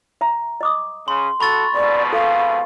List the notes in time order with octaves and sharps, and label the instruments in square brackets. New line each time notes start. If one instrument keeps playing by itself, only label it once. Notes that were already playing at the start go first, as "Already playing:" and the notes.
[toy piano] E5 A#5
D#5 D6 D#6
[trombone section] C#3 [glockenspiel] C6
[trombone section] F#4 A4 [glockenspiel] B5 C#6 A6
[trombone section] F2 G#2 B2 [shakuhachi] D5
[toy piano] A4 [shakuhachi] F5